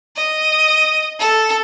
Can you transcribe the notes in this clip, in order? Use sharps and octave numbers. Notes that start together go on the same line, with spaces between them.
D#5
A4